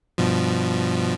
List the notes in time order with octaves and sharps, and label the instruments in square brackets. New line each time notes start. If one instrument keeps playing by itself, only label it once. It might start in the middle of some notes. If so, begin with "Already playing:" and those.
[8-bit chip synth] G2 B2 F3